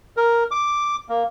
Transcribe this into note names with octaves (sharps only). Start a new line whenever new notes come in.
A#4
D6
A#3